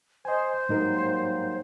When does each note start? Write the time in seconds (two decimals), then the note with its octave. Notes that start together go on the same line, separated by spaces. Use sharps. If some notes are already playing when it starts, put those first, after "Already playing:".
0.25 C5 D#5 G#5
0.69 G#2 F#3 G3 A#3 D#4 A#4